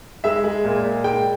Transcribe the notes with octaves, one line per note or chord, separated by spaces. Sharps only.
G#3 E5
G#3
A#2
A#2
G#3 G5